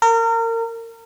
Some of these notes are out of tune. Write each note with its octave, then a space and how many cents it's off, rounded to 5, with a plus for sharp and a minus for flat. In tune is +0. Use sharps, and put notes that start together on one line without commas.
A#4 -30